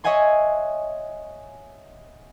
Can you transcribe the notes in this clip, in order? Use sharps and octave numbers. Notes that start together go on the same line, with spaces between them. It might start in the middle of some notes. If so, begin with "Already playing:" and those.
C#5 D#5 E5 F#5 G#5 C6